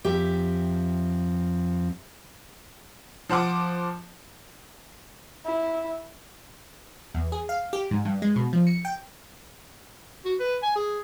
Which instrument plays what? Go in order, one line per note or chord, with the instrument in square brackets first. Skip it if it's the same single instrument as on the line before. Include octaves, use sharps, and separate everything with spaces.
[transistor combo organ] F2 [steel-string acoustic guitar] G4 E5
[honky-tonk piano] F3 C5 F#5 D6
[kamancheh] E4
[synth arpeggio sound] E2
G#4
F5
G4
G#2
G2
G#3
B2
F3
C#7
G5
[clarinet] F#4
B4
G#5
G#4